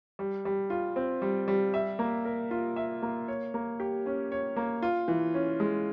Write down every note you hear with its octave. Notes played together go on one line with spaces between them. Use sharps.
G3
G3
F4
C4
G3
G3
E5
A#3
A#4
F4
E5
A#3
C#5
A#3
G4
C#4
C#5
A#3
F4
E3
C#4
G#3